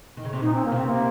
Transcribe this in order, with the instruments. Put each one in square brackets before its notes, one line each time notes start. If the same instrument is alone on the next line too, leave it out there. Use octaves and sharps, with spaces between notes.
[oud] D#3
C#3
C3
[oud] A#2 [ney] D#4
[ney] C4
A#3
[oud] C#3
[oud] C3 [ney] C4
[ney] A#3